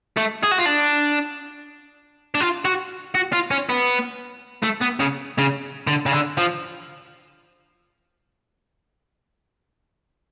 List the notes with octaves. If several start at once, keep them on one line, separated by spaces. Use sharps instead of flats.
A3
G#4
F#4
F4
D4
D4
F4
F#4
F#4
F4
C#4
B3
A3
B3
C#3
C#3
D3
C#3
D3
F3